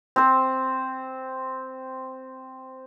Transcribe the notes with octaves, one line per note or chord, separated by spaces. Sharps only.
C4 C5